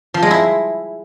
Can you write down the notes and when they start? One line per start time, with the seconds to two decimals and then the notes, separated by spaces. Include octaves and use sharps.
0.14 F3
0.23 G#3
0.31 E4